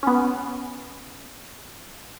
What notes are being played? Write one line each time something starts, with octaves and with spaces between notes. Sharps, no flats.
B3 C#4